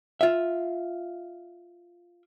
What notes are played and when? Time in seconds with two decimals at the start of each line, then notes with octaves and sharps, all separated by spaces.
0.21 F4 E5